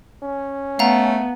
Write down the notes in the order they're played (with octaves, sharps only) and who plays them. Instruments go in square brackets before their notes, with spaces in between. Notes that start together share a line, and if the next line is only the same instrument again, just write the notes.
[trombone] C#4
[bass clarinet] A3 [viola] B3 [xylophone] F5 F#5 A#5